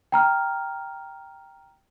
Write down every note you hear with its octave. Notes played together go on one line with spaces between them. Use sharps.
G5 A#5 F6